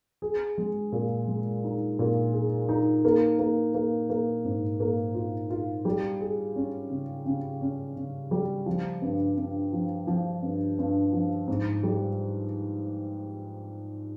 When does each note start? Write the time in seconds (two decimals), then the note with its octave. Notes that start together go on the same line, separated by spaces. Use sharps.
0.22 G#4
0.58 G#3
0.92 A#2
1.28 G#3
1.64 D#4
1.99 A#2
2.33 G#4
2.69 D#4
3.05 A#3
3.39 A#3
3.74 A#3
4.10 A#3
4.45 G#2
4.80 A#3
5.14 F4
5.50 F4
5.85 G3
6.21 G#4
6.56 C#4
6.90 C#3
7.26 C#3
7.61 C#4
7.96 C#3
8.31 G3
8.66 F3
9.02 G2
9.37 G2
9.73 F3
10.07 F3
10.42 G2
10.78 G2
11.13 F3
11.48 G#2
11.83 G3